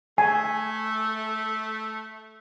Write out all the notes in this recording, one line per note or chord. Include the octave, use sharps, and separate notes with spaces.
A3 G#5